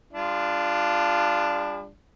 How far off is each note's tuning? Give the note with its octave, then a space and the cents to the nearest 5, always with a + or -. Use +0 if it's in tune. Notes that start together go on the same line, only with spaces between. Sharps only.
G3 +45 D4 +0 F4 -10